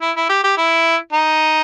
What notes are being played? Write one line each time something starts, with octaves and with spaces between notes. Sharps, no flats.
E4
E4
G4
G4
E4
D#4